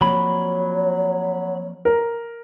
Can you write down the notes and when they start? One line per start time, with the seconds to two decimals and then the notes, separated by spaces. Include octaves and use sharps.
0.01 F3 F#3 A#3 C4 C#5 B5
1.85 A#4